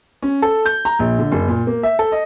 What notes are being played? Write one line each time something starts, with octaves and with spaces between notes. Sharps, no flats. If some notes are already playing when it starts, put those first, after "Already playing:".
C#4
A4
G6
A#5
A#1
D3
F#1
A#2
A#3
E5
A4
D#5